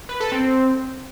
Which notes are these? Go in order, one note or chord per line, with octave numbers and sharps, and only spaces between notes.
B4
A4
C4